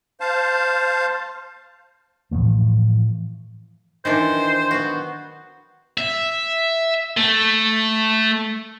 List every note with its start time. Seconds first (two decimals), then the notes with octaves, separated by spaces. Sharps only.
0.20 C5 F5 A5
2.31 A2 E3 F3 A3
4.05 D#3 E3 D4 C5
4.71 B3 F#4
5.98 E5
7.17 A3